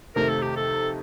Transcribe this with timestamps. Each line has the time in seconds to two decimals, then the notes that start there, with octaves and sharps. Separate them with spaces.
0.16 F2 C3 D#3 A3 A#4
0.29 A4
0.42 G4
0.56 A4